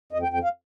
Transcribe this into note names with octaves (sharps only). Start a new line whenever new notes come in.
F2 D#5
G5
F2
G5
F5